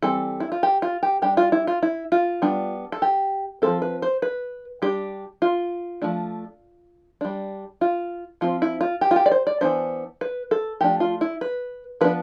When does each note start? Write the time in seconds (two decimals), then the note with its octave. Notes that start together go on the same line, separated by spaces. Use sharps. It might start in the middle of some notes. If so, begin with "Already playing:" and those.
0.02 E3 G3 C4 A4
0.40 E4
0.52 F4
0.63 G4
0.82 F4
1.03 G4
1.22 G3 D4 G4
1.37 F4
1.52 E4
1.67 F4
1.83 E4
2.12 F4
2.42 G3 B3 D4
2.92 A4
3.02 G4
3.62 F3 A3 C4 A4
3.82 B4
4.02 C5
4.22 B4
4.82 G3 D4 G4
5.42 F4
6.02 F3 A3 D4
7.21 G3 D4
7.81 F4
8.41 F3 C4 F4
8.62 E4
8.81 F4
9.01 G4
9.11 F4
9.16 G4
9.26 D5
9.31 C5
9.47 D5
9.61 E3 B3 D4 C5
10.21 B4
10.51 A4
10.81 F3 A3 D4 G4
11.00 F4
11.21 E4
11.41 B4
12.01 F3 B3 D4 B4